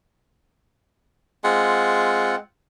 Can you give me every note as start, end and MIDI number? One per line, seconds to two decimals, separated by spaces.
1.44 2.38 56
1.44 2.36 60
1.44 2.36 65
1.44 2.36 78